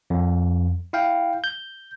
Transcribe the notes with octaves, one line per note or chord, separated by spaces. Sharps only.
F2
E4 F5 G5
G6